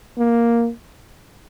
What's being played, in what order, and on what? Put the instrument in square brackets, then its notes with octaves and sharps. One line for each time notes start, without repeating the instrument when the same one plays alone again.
[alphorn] A#3